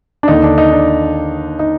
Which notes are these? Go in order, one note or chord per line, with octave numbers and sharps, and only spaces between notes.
D4
D#2 D3 D#4
D4
D#4
D4
D#4